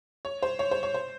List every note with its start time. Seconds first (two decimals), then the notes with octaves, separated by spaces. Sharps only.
0.25 C#5
0.42 C5
0.59 C#5
0.71 C5
0.83 C#5
0.94 C5